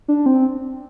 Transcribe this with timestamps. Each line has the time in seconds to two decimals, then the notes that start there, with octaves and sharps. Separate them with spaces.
0.08 D4
0.26 C4